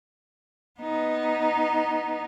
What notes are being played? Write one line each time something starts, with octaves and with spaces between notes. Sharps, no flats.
B3 D#4